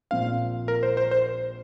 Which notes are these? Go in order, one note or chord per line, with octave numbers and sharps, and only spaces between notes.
A#1 A#2 F3 C4 F5
A#4
C5
C5
C5